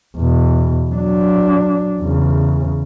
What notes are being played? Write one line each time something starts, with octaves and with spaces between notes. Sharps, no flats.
E2 B2
F#3 D4
E2 C#3